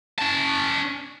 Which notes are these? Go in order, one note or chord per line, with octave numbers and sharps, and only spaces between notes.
C#4 A5